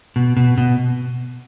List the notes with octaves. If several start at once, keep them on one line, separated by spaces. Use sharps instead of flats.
B2
B2
B2